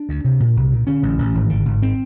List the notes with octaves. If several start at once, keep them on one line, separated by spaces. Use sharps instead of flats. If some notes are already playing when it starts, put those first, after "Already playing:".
Already playing: D4
D2
C3
A#2
C2
A#2
D3 C#4
A1
A1
G#1
D3
G#1
C4